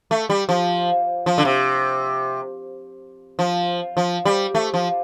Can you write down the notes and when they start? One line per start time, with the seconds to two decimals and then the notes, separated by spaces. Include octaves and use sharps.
0.11 A3
0.30 G3
0.49 F3
1.26 F3
1.38 D3
1.45 C3
3.39 F3
3.97 F3
4.25 G3
4.55 A3
4.74 F3